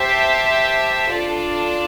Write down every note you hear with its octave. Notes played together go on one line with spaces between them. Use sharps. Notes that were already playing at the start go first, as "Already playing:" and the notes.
Already playing: G4 C5 E5 A5
D4 F4 A4 D5 A5